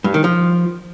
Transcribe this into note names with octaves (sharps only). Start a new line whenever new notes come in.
G2
D#3
F3